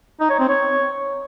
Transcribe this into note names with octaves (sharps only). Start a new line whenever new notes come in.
D#4
C#5
C4
C#5